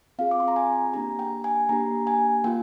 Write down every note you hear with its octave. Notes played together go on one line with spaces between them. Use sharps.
C4 F4 G#4 F5
D6
C6
A#5
G#5
A#3 D4 G4 A#5
G5
G#5
A#3 D4 G4 A#5
G#5
A#3 F4 G5